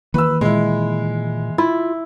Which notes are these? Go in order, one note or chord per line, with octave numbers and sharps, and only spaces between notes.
D#3 E3 A#3 B4 E6
A#2 G#3 E4
E4 F4